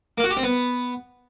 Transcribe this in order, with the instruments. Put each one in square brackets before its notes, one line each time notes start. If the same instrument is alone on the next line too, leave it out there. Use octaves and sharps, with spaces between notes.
[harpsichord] A#3
F#4
G4
C4
B3